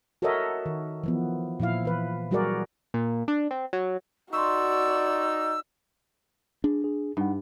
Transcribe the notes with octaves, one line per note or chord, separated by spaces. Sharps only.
F#4 A4 A#4 C#5 D#5 E5
D#3
E3 F3 B3
A#2 F3 E4 F5
E3 B4
F#3 G3 F#4 G#4 A#4 D5
A#2
D4
C4
F#3
D#4 F#4 D5 C6 C#6 E6
D4 G#4
G#4
G2 D#4 F#5